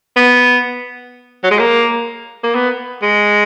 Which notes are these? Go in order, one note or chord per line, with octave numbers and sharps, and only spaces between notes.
B3
F#3
G#3
A#3
A#3
B3
G#3